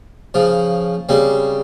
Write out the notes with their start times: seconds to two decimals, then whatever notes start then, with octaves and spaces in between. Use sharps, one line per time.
0.34 C#3 F3
1.09 C#3 G3 C4